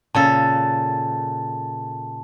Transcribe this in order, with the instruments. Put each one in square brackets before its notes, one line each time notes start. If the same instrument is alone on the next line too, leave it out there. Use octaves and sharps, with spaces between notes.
[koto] A#2 C#3 A4 [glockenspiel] A5